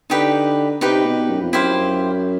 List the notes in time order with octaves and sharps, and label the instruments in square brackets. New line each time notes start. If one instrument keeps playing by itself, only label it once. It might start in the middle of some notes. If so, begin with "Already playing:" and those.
[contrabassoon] D3 [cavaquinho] D#4 G4 B4
[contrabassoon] C3 [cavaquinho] D#4 G4 B4
[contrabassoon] B2
F#2
F2
[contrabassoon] F#2 [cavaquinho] E4 G4 C5 F5